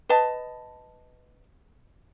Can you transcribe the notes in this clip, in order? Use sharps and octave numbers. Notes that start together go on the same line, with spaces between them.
B4 D#5 A5